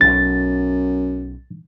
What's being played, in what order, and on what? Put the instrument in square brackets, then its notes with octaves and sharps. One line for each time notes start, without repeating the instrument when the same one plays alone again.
[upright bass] B1 [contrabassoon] F#2 [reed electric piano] A6